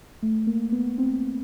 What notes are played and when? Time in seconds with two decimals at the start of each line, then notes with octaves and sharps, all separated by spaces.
0.22 A3
0.47 A#3
0.72 B3
0.98 C4